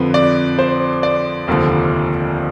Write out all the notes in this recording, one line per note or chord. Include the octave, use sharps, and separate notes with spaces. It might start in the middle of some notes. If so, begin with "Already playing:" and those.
Already playing: F2 D3 F3 B4
D5
C5
D5
F1 D#2 D3 F3